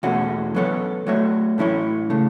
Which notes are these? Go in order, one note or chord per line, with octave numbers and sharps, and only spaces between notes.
E2 B2 A3 C#4 F#4
F#3 B3 A4 C#5
F#3 A3 F#4 C#5
A2 E3 C#4 E4 C#5
C#3 A3